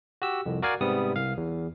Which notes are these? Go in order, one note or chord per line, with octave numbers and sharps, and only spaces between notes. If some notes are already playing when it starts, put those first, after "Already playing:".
F#4 G4 E6
C2 F2
F#4 A#4 D5 F5 G#5
G#2 C3 G3 B3 D#6
C2 F5
E2